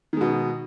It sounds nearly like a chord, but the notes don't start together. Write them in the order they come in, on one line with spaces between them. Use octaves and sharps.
D#3 G#3 B2